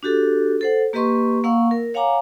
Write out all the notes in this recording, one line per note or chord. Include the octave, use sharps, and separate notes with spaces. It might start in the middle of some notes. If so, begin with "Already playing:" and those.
D4 F#4 G4 A4
A4 C5 F#5
A#3 G4 B4 D#5 C6 C#6
A#3 F5 F#5 C#6 E6
A#4
C#5 F5 F#5 G#5 A#5 D6